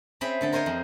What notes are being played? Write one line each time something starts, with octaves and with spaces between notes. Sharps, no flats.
C4 C#4 G#4 C5 E5 B5
D3 A3 A4
A#4 C5 C#5 D#5 G#5
F2